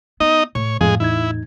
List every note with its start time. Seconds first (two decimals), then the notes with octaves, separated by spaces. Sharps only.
0.20 B3 D#4 D#5
0.55 A2 C#5
0.81 F2 A2 G#3 G#4 F5
1.00 E2 D#4 E4 G#6